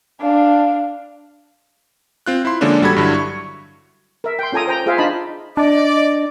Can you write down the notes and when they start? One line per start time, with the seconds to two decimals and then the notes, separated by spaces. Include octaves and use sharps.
0.21 D4 F5
2.26 C4 F4 F#6
2.45 E4 C6
2.61 D3 F3 G#3 A#3 C#4 D4
2.82 A1 G3 F#4 A4 B5 G#6
2.96 G2 D3 F#3 E4
3.14 C#6
4.24 A#4 E5
4.39 G5 C6
4.52 C#4 F4 A4 G#5 A#5 D#6
4.67 C5 G5 A#5
4.86 F4 G#4 C5 E5 F5
4.98 D4 D#4 F4 D#5 A5 B5
5.57 D4 D5 D#5